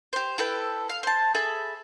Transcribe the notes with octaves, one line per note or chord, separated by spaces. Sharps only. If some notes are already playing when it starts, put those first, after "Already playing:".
G4 C5
E4 A4 B4 G5
F5
C5 A5
G#4 A4 E5 B5